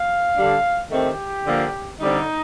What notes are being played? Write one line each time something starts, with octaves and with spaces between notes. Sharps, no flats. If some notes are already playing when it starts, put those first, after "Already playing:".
Already playing: F5
D3 G3 D4
D#3 A3 C4 G4
D3 F3 A#3
D3 G3 C4 D#4